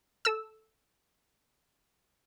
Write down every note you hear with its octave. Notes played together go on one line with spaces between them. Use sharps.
A4 E6